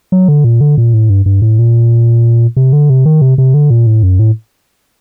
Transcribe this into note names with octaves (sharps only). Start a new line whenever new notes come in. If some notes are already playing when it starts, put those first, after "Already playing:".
F#3
D3
A#2
D3
A#2
A2
G2
G2
A2
A#2
C3
D3
C3
D#3
C3
C3
D3
A#2
A2
F#2
A2